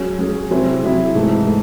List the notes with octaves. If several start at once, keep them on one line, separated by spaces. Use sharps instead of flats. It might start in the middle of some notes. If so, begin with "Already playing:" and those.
Already playing: F#3 C#4 G#4
F#3 C#4 G#4
C3 F#3 C4 E4 G#4
C3 F#3 C4 E4 G#4
G#2 E3 A3
A3